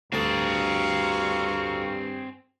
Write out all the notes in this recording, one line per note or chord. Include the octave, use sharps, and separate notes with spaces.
D2 G2 C4 G#4 F5 A5 A#5 C#6